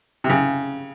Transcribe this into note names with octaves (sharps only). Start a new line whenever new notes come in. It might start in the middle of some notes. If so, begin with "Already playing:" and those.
C3
C#3